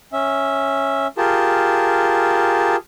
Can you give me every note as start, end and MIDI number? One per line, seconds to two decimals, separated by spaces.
0.13 1.07 61
0.13 1.07 76
1.17 2.76 65
1.17 2.76 67
1.17 2.76 68
1.17 2.76 70
1.17 2.76 81